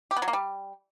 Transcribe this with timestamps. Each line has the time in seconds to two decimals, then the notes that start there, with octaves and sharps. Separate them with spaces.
0.11 G4
0.16 B3
0.22 F#3
0.28 A#3
0.33 G3